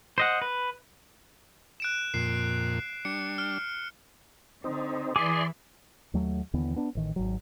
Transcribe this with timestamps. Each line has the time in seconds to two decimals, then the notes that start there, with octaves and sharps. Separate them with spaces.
0.18 C5 D#5 F#5
0.42 B4
1.80 F#6 D7 E7
2.14 F2 A#2 C7
3.05 G3 D4 C#7
3.38 F6
4.64 D3 C4 D#4
5.16 E3 G#4 D5 E5 C6 D6
6.14 D#2 F#3 A3
6.54 D#2 D3 E3 B3
6.76 B3 D4
6.95 A1 D#3
7.16 G#1 F#3